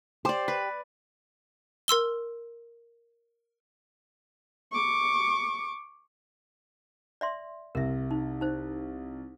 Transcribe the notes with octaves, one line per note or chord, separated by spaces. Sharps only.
G4 C5 D5
B4
A#4 C6 E6 G7
C#6 D6
D5 E5 C6
C2 A#4 E5
D#4
D#4 C5